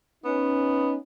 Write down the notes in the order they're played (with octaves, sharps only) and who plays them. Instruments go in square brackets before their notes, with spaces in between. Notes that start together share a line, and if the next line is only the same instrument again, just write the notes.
[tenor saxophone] B3 [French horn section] C#4 D#4